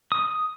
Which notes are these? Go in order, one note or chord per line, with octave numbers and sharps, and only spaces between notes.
D#6